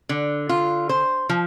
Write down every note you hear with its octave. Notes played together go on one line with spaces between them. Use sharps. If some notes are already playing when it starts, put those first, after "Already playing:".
D3
F4
C5
F3